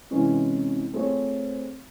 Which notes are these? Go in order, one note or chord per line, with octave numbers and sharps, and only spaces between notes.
C3 E3 G#3 C#4
A3 C4 F4 G#4 C#5